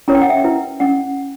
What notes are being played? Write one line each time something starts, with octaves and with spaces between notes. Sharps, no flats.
C#4 E4 A#4 C#5 A#5
G5
F#5
E5 G5
E4 B4
C#4 F#5